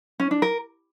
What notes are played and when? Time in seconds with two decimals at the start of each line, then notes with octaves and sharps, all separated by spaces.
0.20 C#4
0.31 D4
0.42 A#4